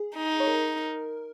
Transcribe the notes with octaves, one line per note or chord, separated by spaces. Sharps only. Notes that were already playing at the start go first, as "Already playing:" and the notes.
Already playing: G#4
D#4
C#5
A#4